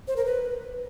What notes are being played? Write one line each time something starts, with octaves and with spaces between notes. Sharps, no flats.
C5
A#4
B4